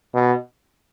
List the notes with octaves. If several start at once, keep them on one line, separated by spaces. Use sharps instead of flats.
B2